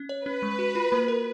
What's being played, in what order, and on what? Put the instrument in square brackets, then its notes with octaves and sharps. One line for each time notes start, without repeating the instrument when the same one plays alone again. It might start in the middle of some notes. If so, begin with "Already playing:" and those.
Already playing: [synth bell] C#4
C#5
[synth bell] C#4 [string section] B4
[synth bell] G#3
F#4
F4
A#3
A#4